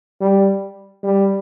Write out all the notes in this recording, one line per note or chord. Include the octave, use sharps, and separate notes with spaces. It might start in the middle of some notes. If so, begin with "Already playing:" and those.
G3
G3